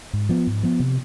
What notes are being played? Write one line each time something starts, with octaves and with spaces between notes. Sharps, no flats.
G#2
F3 B3
G#2
F3 B3
C3